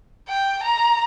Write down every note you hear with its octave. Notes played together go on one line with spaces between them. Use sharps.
G5
A#5